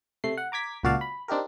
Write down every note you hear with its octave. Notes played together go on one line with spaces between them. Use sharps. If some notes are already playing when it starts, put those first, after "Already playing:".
C3 A3 C7
F#5
A#5 D6 G#6 B6
C#2 A#2 F#4 D5 F5 A5
B5
C4 D4 D#4 G4 A#4